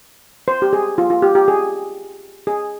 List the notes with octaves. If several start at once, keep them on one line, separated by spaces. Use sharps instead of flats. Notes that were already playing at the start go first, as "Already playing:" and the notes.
C5
G4
G#4
F4
F4
G4
G4
G#4
G#4